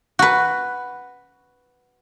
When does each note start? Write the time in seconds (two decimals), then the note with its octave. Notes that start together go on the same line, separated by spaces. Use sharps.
0.19 F#4 B4